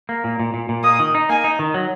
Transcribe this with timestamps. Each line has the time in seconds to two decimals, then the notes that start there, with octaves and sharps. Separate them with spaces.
0.09 A#3
0.24 A#2
0.40 A#2
0.54 A#2
0.69 A#2
0.84 A#3 D#6
0.99 D#3
1.15 D#4
1.29 A#3 G#5
1.44 D#4
1.59 D#3
1.74 F#3